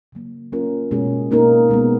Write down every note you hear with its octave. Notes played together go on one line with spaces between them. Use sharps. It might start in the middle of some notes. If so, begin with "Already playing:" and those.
C#3 F#3 A#3
F#3 A#3 C#4 F4 A#4
B2 G#3 C#4 G#4
B2 A#3 D#4 A#4
B2 G#3 B3